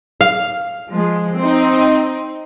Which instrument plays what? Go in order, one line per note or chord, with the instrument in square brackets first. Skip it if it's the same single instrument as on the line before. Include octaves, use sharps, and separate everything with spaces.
[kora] F5
[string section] F3 G#3
C4 D#4